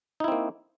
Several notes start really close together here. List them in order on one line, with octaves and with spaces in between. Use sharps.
D#4 E4 C4 A#3